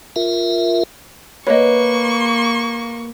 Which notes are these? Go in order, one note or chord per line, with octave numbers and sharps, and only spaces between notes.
F4 A#4 E5
A#3 B4 C#5 D#5 C#6